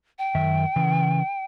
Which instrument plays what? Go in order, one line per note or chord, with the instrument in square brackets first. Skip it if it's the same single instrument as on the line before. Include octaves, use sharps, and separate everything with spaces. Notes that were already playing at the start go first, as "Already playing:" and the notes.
[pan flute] G5
[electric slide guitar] F#2 D#3 E5
C#3 E3